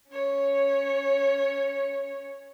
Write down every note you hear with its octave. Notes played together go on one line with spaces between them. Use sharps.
C#4 C#5